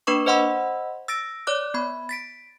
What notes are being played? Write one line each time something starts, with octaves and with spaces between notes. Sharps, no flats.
A#3 D4 B4 C#6 D6
C5 D#5 F#5 B5 C6 E6
E6 A6 A#6 D7
C#5 D5 D6 F#6
B3 B5
A6 B6 D7